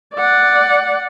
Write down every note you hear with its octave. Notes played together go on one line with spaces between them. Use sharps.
D5 F#5